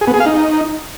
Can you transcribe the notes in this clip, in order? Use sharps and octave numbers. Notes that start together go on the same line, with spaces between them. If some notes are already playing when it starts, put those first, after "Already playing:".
G#4
B3
G#4
F5
D#4